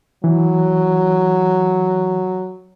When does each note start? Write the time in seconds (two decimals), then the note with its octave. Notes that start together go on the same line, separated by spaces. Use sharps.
0.24 E3 F#3